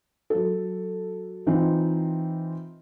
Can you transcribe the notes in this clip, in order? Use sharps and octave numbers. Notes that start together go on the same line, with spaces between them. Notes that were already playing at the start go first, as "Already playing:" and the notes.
F#3 A4
E3 C4 D#4 F4